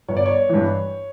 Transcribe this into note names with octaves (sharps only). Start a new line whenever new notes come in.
G1 C#5
D5
C#5
G2 E3